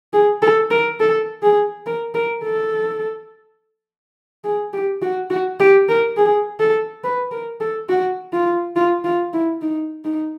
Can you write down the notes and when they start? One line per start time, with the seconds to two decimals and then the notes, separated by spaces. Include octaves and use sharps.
0.13 G#4
0.42 A4
0.70 A#4
1.00 A4
1.43 G#4
1.86 A#4
2.14 A#4
2.44 A4
4.44 G#4
4.73 G4
5.02 F#4
5.30 F#4
5.60 G4
5.89 A#4
6.17 G#4
6.60 A4
7.04 B4
7.32 A#4
7.60 A4
7.89 F#4
8.33 F4
8.76 F4
9.04 F4
9.33 E4
9.61 D#4
10.04 D#4